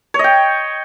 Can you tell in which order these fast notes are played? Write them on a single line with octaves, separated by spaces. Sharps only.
C#5 D#5 G5